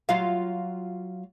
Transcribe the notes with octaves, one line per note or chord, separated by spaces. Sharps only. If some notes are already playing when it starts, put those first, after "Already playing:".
F#3 F4 F5